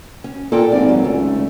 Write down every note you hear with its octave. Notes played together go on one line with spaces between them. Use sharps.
C#4
A#2 A4 G5
G#1 D5
F#3
C#2 A3